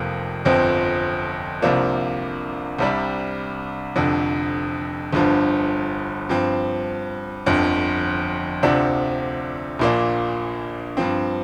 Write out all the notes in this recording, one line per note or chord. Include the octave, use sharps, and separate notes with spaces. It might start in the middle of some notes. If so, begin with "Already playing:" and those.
Already playing: F1 F2 F3 A#3
G1 F2 F3 C4
C2 C3 F3 A#3 D4
C2 C3 G3 D4
F1 F2 D3
G1 G2 D3 F3
G2 F3 C4
G1 F2 D3
D2 C3 F3 D4
A#1 A#2 A#3 D4
G2 F3 C4